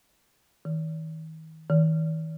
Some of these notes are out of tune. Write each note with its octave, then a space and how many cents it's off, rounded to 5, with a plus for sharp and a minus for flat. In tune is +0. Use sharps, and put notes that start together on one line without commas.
D#3 +40
D#3 +45